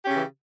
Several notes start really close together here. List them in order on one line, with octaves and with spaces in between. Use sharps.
G4 C#4 C#3 E3